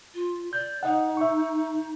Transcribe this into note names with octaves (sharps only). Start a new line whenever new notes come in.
F4
D5 G6
D#4 D#5 F#5
E5 C#6